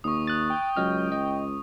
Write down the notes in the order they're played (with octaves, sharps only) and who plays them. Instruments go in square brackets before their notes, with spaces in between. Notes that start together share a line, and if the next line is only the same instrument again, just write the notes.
[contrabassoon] D#2 [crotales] C#6 D#6
[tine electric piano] F#6 A6
[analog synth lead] G5
[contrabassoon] C#2 [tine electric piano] F#3 D#5 F6
[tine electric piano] D#5